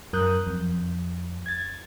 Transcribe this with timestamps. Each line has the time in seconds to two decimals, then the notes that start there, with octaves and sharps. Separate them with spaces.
0.13 F#2 A#4 D#6 F#6 G6
0.47 F2
1.46 G#6 A6